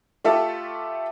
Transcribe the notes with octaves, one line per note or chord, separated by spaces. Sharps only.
A3 F4 G4 A4 E5